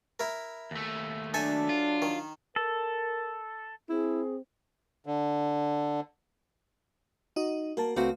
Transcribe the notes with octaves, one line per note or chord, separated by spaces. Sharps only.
E4 A#4
D#2 A3
F#3 D4 A4 E5 G#5
F4
D#3
A4 A#4
C4 E4 G#4
D3
D#4 F#4 D#5
A#3 F#4 A#4 A5
C#2 A3 C4 F#4 B4 F5